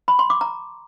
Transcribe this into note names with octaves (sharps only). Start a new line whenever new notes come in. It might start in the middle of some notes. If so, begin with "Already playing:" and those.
B5
C6
D6
A#5